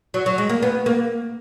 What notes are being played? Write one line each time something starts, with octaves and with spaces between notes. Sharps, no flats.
F#3
F#3
G#3
A#3
B3
A#3